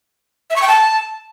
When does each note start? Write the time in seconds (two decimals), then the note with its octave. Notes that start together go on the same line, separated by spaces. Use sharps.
0.50 E5
0.56 C#6
0.62 G5
0.68 A5